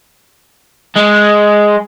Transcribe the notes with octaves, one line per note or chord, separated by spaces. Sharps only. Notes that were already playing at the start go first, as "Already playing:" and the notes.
G#3